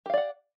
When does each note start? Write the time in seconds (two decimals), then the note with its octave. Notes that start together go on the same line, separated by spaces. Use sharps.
0.06 G4
0.10 F5
0.14 D5
0.17 F#5